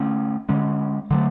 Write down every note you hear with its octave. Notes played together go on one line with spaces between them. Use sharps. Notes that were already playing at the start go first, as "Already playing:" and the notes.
Already playing: D3 A3 C#4
D3 G#3 C#4
D3 F#3 A3